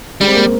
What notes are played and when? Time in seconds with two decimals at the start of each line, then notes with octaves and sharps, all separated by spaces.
0.21 G3 G#3
0.27 C4
0.34 A#3